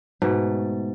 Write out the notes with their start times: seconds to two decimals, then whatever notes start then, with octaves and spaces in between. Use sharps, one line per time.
0.22 G#2 B2 A3